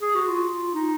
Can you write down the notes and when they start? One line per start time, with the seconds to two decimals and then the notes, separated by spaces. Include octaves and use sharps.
0.01 G#4
0.15 F#4
0.28 F4
0.74 D#4